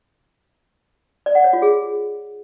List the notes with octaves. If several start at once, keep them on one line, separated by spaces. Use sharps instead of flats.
D5
F#5
C#5
F4
G#4